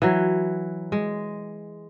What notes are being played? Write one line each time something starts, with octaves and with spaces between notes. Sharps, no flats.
E3 F#3
G#3